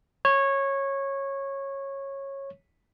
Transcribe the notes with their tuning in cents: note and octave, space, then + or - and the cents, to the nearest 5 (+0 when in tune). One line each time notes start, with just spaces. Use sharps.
C#5 -15